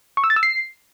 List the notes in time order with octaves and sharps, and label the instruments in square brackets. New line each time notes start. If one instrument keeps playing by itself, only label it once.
[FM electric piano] C#6
E6
A6
E6
C7